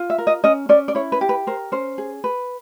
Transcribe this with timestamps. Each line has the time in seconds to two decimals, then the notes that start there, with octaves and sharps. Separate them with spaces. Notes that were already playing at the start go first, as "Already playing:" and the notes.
Already playing: F4
0.10 E5
0.18 A#4
0.27 D#5
0.44 C#4 D#5
0.69 C#4 D5
0.88 D5
0.95 E4 C#5
1.12 B4
1.21 G4
1.29 B4
1.47 A#4 C5
1.72 C#4 C5
1.98 G#4
2.24 B4